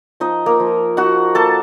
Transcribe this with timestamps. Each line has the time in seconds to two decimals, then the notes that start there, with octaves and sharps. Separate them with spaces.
0.20 F3 D#4 D#5
0.46 A#3 A#4
0.60 F3
0.97 D#4 F#4 F#5
1.35 A#3 A4 A5